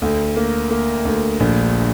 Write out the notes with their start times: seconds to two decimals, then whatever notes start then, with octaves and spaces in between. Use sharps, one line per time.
0.02 D2
0.36 A#3
0.70 A#3
1.05 D2
1.40 A#1